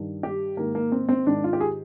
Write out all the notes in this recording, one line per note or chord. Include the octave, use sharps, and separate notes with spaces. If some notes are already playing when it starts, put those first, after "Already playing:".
Already playing: G2 D#3
G4
G#2 D#3 A#3
A#3
C4
C4
G#2 D#3 D4
F4
G4
G#4